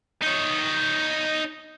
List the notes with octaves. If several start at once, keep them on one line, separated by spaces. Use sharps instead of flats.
D#4 C#5